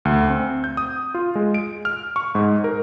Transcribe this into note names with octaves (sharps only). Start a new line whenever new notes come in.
D2
C4
G6
D#6
F4
G#3
D7
F6
C#6
G#2
A#4